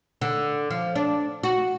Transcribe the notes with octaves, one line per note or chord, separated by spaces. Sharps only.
D3
F3
D4
F#4